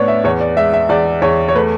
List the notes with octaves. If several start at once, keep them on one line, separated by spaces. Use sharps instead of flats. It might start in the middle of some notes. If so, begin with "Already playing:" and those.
Already playing: A2 B3 D4 C#5 D5
E5
E2 C#5
D5
G#3 E5
E5
E2 D5
E2 C#5
C#5
A3 B4